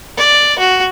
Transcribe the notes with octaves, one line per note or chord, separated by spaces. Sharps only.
D5
F#4